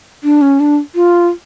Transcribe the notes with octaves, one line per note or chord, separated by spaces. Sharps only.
D4
C#4
D4
F4